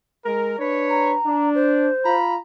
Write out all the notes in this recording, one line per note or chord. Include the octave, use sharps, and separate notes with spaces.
G#3 A#4
D4 B4 C#5
A#5
D4
C5
F4 A#5 B5